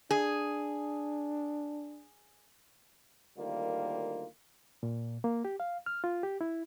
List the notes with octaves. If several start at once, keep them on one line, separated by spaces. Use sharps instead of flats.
D4 G#4
D2 D#3 G3 A#3 F4
A#2
A#3
G4
F5
F6
F4
G4
E4